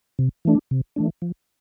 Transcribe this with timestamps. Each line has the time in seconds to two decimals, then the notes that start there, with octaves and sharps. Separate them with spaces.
0.19 C3
0.45 E3 A3 D4
0.71 C3
0.96 E3 A3 D4
1.22 F3